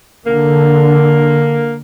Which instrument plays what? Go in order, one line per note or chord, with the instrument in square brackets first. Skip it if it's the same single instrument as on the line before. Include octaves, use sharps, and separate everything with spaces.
[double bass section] D3 [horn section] A#3